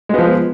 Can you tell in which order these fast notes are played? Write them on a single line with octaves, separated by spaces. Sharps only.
G#3 B3 F3